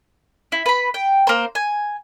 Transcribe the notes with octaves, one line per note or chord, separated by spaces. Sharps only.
E4
B4 B5
G5
A#3 C5
G#5